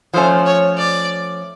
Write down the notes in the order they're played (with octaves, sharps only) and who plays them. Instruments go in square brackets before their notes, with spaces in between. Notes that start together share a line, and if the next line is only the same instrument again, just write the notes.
[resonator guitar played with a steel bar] F3 A3 C#4 [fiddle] C5
[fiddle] C#5
D5